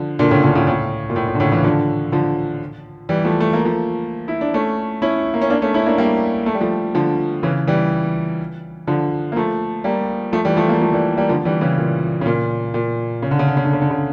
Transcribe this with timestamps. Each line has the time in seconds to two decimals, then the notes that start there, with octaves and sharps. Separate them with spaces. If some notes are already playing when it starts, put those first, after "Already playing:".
Already playing: D3 F3
0.19 A#2 D3
0.31 A2 C#3
0.44 A#2 D3
0.55 A2 C#3
0.67 A2
1.10 A#2
1.16 A2
1.28 A2
1.35 D3
1.40 A2 C#3
1.52 C#3 E3
1.64 D3 F3
2.12 D3 F3
3.09 E3 G3
3.25 F3 A3
3.40 A3
3.53 A#3
3.65 F3 A3
4.28 E4
4.41 D4
4.54 A3 C#4
5.02 C#4 E4
5.34 A#3
5.41 C#4
5.50 A#3 D4
5.62 A3 C#4
5.74 C#4 E4
5.86 A#3 D4
5.98 G3 A#3
6.46 A3
6.54 G3
6.61 F3 A3
6.95 D3 F3
7.43 C#3 E3
7.67 E3 G3
8.87 D3 F3
9.32 A#3
9.36 F3 A3
9.84 G3 A#3
10.33 F3 A3
10.45 E3 G3
10.57 F3 A3
10.69 G3 A#3
10.81 F3 A3
10.93 E3 G3
11.17 G3 A#3
11.29 D3 F3
11.45 E3 G3
11.61 C#3 E3
11.78 A#2
12.21 C#3
12.26 A#2
12.74 A#2
13.22 C#3
13.31 D3
13.39 C#3
13.48 D3
13.57 C#3
13.65 D3
13.73 C#3
13.82 D3
13.91 C#3